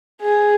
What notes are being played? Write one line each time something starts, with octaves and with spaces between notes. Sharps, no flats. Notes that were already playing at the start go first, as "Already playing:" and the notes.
G#4